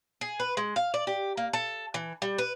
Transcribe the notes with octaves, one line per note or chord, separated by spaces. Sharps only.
G#4
B4
G#3
F5
D5
G4
A#3
A4
E3
G3
B4